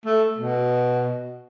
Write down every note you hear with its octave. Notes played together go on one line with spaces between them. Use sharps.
A3
B2